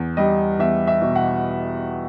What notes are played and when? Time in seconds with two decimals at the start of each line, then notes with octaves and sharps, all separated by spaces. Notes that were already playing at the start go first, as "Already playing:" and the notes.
Already playing: E2
0.17 G3 D#5
0.59 E2 E5
0.87 E5
1.02 B2
1.16 F#5